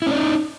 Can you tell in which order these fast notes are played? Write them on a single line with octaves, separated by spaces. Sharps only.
E4 C#4 D5 D#4